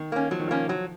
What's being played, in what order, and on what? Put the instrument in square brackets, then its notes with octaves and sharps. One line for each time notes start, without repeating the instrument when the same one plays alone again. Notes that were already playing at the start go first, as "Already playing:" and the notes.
Already playing: [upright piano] D#3
[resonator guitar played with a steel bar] A#3 C#4
[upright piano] F3 [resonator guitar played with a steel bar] F#3
[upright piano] D#3
[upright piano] F3 [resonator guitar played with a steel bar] A#3 C#4
[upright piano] F3 [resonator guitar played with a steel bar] F#3